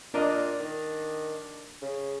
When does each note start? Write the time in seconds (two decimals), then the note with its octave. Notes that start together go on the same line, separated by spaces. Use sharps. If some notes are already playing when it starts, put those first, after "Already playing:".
0.14 A#2 D4 A#4 D#5
0.60 D#3
1.82 C#3